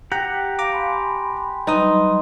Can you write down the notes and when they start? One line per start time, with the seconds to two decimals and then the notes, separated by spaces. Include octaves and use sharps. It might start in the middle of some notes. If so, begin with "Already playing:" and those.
0.12 G4 F#5 G5 A#5
0.59 F5 A#5 D6
0.72 G#5 B5 C6
1.67 F#3 G3 D#4 B4 C6 D#6